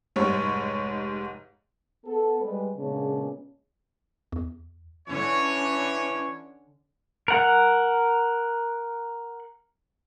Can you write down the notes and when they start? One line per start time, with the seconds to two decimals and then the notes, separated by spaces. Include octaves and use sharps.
0.16 F1 G#2 G3 C#5
2.06 B3 A4
2.41 G3 G#3 B4
2.77 A#2 C#3 G#3 B3 C#4 D4
4.32 E2
5.08 D3 E3 C#4 D4 C#5
7.28 A#4 F#5